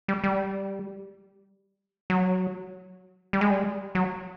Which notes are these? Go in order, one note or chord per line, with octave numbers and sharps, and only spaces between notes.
G3
G3
F#3
G3
G#3
G3
F#3